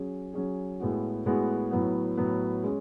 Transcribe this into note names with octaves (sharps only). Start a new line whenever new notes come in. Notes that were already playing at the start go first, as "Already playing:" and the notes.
Already playing: F#3 C#4 G#4
F#3 C#4 G#4
A2 G#3 B3 F#4
A2 G#3 B3 F#4
A2 F#3 B3
A2 F#3 B3
G#3 C#4